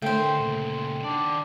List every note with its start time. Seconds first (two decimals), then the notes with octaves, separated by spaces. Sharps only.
0.02 D3 A3 A#4 C5 F5 G5
0.40 A#2 C#3
1.03 D#3 D4 D5